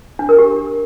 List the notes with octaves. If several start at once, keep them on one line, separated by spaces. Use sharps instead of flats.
D4
A#4
G4